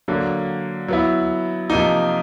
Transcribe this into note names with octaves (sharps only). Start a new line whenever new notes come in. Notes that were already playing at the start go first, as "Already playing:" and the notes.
D3 F#3 A#3
F#3 B3 E4
C3 F3 A#3 D#4